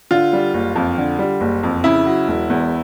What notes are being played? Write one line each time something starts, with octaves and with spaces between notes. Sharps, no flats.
D3 F4
G3
F#1
F2
D3
G3
F#1
F2
C#3 E4
F#3
E1
E2